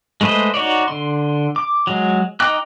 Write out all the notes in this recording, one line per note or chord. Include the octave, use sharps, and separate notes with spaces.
G#3 A3 B4 C5 D#5
D#4 F#4 C#5 D5
D3 C6
D6
F#3 G#3
D#4 D#5 G5 D6 F#6